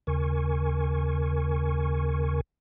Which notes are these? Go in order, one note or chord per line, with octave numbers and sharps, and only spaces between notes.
D#2 C#3 A#4 G#5 C#6